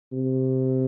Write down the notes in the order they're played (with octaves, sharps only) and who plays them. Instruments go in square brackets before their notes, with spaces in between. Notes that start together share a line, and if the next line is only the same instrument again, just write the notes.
[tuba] C3